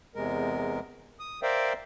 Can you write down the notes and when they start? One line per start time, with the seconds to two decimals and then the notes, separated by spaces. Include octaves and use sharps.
0.15 E2 C3 G#3 A#4
1.20 D#6
1.43 A#4 C5 D5 E5 F5 G5